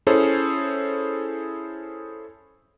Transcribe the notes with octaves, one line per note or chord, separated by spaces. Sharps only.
C#4 E4 G#4 A4 C5 C#5